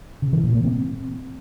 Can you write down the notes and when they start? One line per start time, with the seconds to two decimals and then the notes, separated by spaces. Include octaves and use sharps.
0.22 C#3
0.33 E3
0.43 A#2
0.54 A#3
0.65 C4